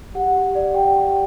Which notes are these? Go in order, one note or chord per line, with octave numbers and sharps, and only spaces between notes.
G4 F#5
G4
D5
G4 D5 G5
G4